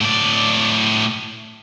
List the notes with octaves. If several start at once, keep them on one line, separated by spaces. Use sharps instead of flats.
A2 D5